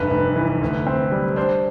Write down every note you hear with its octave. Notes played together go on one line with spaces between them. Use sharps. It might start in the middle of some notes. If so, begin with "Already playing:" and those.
Already playing: F1 G2 B4
F1
E3
D2
C4
G3
D4 C5